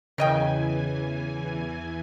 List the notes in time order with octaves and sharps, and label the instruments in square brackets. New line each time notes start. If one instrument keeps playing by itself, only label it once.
[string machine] E2 E3 G#5 [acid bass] C#3 [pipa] A#4 D#5 G5